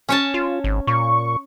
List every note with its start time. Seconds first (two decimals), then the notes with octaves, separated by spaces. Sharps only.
0.09 C#4 C#5 A5
0.34 F4
0.64 G#1
0.87 A#2 C#6